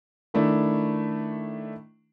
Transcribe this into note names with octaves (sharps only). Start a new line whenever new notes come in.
D#3 A3 D4 E4